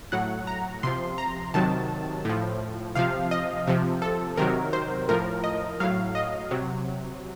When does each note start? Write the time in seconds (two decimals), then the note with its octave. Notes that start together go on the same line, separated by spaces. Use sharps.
0.12 A2 F#3 F#5
0.47 A#5
0.83 C3 F3 C6
1.18 A#5
1.54 C3 D#3 F#3 A5
2.25 A2 F3
2.95 C3 F3 F5
3.31 D#5
3.67 C3 F3
4.02 A4
4.37 C3 D#3 F#3 A#4
4.73 C5
5.09 A2 F3 A#4
5.44 D#5
5.80 A2 F#3 F5
6.15 D#5
6.51 C3 F#3